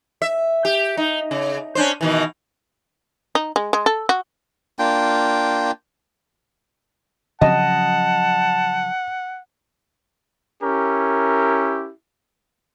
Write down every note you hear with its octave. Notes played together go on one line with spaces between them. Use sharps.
E5
G4
D#4
C#3
C#4 D4 C5
B2 D#3 E3
D#4
G#3
G#3
A4
F#4
A#3 D4 F4 G5
C#3 F3 F#3 D#5 F#5 A5
C#4 E4 G4 A#4